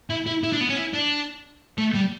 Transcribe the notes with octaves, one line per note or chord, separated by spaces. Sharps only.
E4
E4
E4
D4
B3
C#4
E4
D4
A3
G3